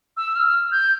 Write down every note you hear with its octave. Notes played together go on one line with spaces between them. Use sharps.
E6
F6
G6